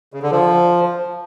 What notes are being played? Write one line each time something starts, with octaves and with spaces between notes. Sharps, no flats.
C#3
D3
F3